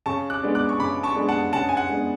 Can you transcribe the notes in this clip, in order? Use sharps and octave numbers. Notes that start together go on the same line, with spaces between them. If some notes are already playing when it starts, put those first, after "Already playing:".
C#3 A5 C#6
D6 F#6
G#3 B3 D4
D6 F#6
C#6
C#3 B5 D6
A5 C#6
G#3 B3 D4
F#5 A5
C#3 F#5 A5
G#5
F#5
G#3 B3 D4